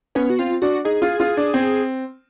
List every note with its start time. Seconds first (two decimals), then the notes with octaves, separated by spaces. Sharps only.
0.15 B3 C#4
0.30 F#4
0.39 C4 F4
0.62 D4 F#4
0.85 D#4 G#4
1.02 F4
1.20 F4
1.37 D4
1.54 C4